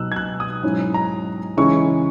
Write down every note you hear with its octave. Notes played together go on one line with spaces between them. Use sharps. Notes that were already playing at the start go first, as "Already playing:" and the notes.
Already playing: B2 F#3 B3 D#4 E6 F#6
G#6
F#6
D#6
G#2 F#3 C#4 E4
A#5
C#3 E3 G#3 C#4 E4 C#6